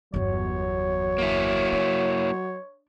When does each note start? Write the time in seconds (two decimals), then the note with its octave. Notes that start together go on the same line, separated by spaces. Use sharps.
0.14 G1 E2 F#3 C#5
1.18 A#3 E4
1.72 D4